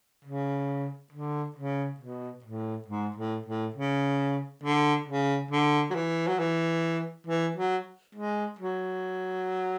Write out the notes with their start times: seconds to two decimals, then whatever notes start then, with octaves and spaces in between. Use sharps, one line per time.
0.25 C#3
1.13 D3
1.56 C#3
2.00 B2
2.44 A2
2.88 G#2
3.16 A2
3.46 A2
3.76 C#3
4.63 D3
5.08 C#3
5.51 D3
5.90 F#3
5.95 E3
6.28 F#3
6.39 E3
7.27 E3
7.56 F#3
8.15 G#3
8.59 F#3